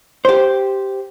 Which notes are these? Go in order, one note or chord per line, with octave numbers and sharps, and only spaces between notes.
G4 C5